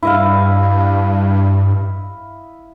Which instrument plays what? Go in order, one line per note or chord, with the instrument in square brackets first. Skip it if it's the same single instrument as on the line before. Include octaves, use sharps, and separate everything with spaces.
[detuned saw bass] G2 [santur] E4 D#5 F5